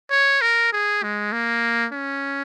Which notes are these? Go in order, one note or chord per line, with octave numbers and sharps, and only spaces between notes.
C#5
A#4
G#4
G#3
A#3
C#4